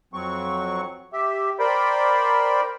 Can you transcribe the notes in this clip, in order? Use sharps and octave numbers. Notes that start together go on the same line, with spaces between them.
F2 F#3 C4 C#6
G4 E5
A#4 C5 D5 G5 B5